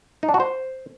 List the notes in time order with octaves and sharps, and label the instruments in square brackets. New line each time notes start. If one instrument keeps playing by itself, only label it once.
[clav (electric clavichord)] D#4
D4
F#4
C5